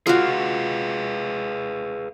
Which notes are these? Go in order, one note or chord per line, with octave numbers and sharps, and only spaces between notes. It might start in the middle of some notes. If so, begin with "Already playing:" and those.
F4 F#4 G#4 B4 F5